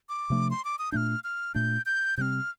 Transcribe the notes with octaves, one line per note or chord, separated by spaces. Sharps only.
D6
C3 F3 A3 D4
C6
D6
D#6
A#2 A3 D4 F6 G6
F6
A#2 A3 D4 G6
G6
C3 G3 C4 F6 G6